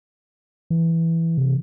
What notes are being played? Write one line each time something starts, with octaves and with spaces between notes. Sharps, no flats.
E3
C3